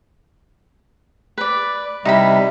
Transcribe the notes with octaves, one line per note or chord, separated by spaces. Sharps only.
B4 D5
C3 G3 D#4 E4 B5